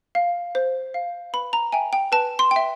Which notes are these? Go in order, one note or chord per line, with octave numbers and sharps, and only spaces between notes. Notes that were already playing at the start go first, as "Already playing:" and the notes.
F5
C5
F5
B4 B5
A#5
E5 G5 G#5
G5
B4 A5
C6
G5
E5